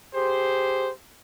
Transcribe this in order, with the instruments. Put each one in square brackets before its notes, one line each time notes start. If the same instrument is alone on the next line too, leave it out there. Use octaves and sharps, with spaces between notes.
[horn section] G4 G#4 C5